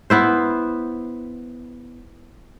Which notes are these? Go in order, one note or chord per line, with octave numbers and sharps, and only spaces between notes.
B3 E4 C5